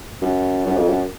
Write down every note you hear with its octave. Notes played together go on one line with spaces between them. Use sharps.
F#2
F#2
F2
F#2